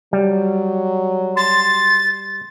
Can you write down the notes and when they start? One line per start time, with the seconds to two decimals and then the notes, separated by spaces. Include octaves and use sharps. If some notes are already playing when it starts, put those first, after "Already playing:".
0.13 F#3 G3
1.37 C6 A6